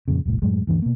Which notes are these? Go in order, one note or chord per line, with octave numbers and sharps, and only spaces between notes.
F2 A#2 C#3
E1 C2 A2
F#2 A2 F#3 G#3
D2 G2 E3 D4
B2 A#3